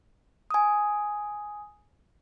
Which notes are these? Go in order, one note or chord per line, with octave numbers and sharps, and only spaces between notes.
G#5 D#6